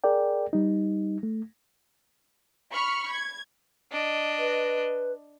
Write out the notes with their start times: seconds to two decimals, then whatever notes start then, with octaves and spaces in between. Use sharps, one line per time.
0.04 G#4 A#4 D5 G5
0.53 G3 D#4
1.23 A3
2.71 B5 C#6 F6
3.11 G#6
3.92 D4 D#5
4.39 B4